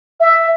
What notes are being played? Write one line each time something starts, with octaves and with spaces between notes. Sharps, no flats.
E5